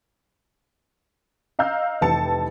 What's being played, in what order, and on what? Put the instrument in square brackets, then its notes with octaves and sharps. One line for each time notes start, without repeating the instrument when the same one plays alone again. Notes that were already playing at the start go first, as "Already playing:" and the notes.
[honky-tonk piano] D#5 F5 A#5 E6 G6
F1 E3 G4 A5 C#7